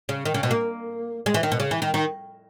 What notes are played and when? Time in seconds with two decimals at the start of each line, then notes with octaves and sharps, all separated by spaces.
0.09 C#3
0.25 D#3
0.34 C#3
0.43 B2
0.51 A#3
1.26 G#3
1.34 E3
1.43 D#3
1.52 B2
1.60 C#3
1.71 E3
1.82 D#3
1.94 D#3